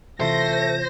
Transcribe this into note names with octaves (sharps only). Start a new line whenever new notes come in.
C3 E3 A3 F4 C5 A#6